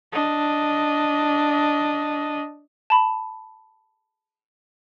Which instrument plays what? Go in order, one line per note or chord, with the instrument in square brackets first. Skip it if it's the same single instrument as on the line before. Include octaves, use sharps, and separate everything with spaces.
[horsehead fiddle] D4 D#5
[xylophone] A5 B5